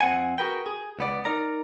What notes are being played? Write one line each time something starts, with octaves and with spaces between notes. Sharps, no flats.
F2 C4 F#5 G#5
F#4 G#4 A#4 B4 G5
G#4
C#2 B3 D5
D#4 A#4 D5 A#5